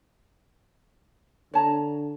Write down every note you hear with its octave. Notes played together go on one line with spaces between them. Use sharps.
D3 C#5 A5 A#5